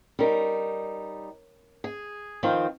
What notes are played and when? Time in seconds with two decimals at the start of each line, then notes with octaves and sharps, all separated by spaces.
0.19 G3 C#4 D#4 A#4
1.84 G#4
2.43 D#3 F3 C4